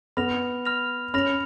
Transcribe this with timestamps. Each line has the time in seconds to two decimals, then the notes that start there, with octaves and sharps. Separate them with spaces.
0.17 B3 B5 F6 A#6 F7
0.65 B5 F6 A#6 F7
1.14 C#4 B5 F6 A#6 F7